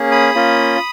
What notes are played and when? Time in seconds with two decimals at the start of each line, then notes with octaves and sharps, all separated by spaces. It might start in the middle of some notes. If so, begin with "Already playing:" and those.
Already playing: A#3 C#4 G#4
0.11 B5 D#6
0.35 A#3 C#4 F4